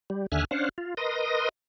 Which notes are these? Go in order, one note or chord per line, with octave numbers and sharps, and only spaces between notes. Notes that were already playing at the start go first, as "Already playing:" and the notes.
G3
D#2 D3 E5 G#5 F6 F#6
C#4 D4 C5 F5 F#5
F4
A#4 B4 D#5 C6 D#6 A#6